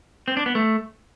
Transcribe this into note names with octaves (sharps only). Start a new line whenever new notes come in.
C4
D4
B3
A3